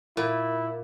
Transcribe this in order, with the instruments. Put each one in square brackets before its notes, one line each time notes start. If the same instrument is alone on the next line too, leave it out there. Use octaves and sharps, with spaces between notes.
[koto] A#2 [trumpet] E4